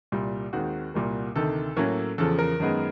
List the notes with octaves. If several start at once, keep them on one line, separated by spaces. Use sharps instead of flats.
C2 A#2 G3
D#2 D#3 G#3 C4 F#4
C2 A#2 G3 A#3
D2 C3 D#3 A4
A2 F#3 A#3 C#4
E2 C#3 F3 A4
A#4
F#2 D#3 G#3 B3